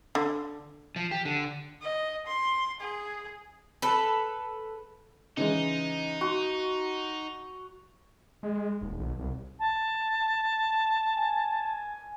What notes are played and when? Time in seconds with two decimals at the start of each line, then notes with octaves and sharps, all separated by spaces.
0.15 D3
0.96 F3
1.11 G4
1.25 D3
1.82 D#5
2.27 C6
2.80 G#4
3.82 A4 B4
5.37 C#3 E3 G#3 D#4
6.21 F#4 C6
8.43 G#3
8.81 D#1
8.99 B1
9.19 C2
9.59 A5
11.17 G#5